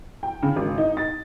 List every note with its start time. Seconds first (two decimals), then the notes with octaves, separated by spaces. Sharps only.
0.23 G5
0.43 C#3
0.56 G#1
0.78 D#4
0.97 A6